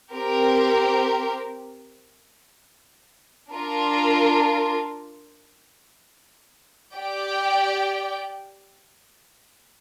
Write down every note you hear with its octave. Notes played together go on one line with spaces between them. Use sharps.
C4 G4 A#4
D4 F4 A#4
G4 D5 G5